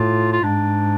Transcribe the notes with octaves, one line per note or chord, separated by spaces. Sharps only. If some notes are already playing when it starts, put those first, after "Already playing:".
Already playing: A2 F4
F4
G#2 D4